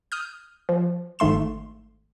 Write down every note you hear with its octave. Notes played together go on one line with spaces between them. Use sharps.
D#6 F6 G6
F3
G#1 G#2 A3 C6 E7